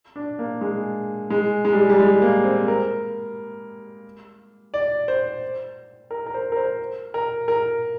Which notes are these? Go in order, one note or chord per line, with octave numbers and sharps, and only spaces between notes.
D4
A#3
G#3
G#3
G#3
G3
G3
G#3
A#3
C4
A#4
D5
C5
A#4
A#4
C5
A#4
C5
A#4
A#4